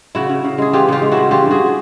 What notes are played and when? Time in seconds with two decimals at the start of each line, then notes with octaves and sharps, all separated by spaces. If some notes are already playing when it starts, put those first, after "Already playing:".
0.15 C#3 E4 F#4
0.29 C#3
0.44 C#3
0.58 G#3 G#4
0.73 E3 F4 G4
0.88 C#3 F4 G4
1.02 G#3
1.11 E4 F#4
1.17 C#3
1.31 E3 F4 G4
1.46 G2
1.51 F#4 G#4